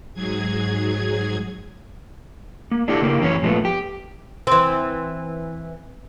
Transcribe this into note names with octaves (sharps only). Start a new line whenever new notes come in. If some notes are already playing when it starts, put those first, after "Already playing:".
G#2 F#3 G#4 G#6
A#3
D4 E4 G4 A4 D5 E5
C#3 A#3 E4 G4
F#2 E3 C#4 G4 C#5
A#2 F3 G#3 A3 B3
G4
E3 C4